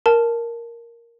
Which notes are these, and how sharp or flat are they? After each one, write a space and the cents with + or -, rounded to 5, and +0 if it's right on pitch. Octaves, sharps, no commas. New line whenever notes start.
A#4 +0 A5 -5